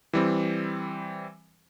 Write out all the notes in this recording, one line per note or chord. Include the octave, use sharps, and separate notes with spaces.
E3 G3 C4